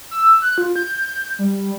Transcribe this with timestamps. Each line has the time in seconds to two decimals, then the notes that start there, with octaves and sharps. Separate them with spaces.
0.11 E6
0.42 F#6
0.58 F4
0.76 G6
1.39 G3